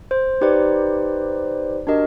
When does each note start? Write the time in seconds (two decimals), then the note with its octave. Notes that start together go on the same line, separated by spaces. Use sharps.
0.11 C5
0.41 D#4 G4 B4 C5 D5
1.87 D4 F#4 G4 A#4 D#5